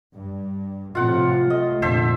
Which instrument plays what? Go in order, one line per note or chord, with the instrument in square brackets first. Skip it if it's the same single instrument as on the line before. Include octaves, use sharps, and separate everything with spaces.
[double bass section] G2
[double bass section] A2 C3 F3 [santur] F4 F#5
[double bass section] A3 [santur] D#5
[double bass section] F1 A#2 D3 [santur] C5 E5 A5